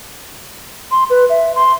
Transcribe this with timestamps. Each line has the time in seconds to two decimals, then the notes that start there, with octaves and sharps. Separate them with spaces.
0.91 C6
1.10 B4
1.30 E5
1.55 C6